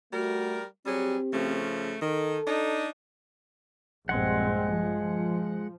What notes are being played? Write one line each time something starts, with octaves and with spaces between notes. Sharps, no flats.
G3 A3 F#4 A#4
F#3 G3 C4 G4 G#4
C#3 F3 A3
D#3 A4
D4 D#4
A#1 G2 G#3 C4 F#5
F3